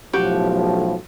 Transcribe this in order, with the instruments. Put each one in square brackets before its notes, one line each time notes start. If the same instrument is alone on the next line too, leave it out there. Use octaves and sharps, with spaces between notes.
[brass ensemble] B1 A2 F3 [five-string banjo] F#4 G4